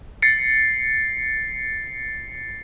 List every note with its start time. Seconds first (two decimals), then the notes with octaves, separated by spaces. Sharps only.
0.22 A6 C7 C#7